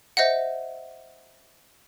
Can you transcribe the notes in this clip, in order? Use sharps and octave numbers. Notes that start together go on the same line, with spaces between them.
C5 D#5 E5 F#5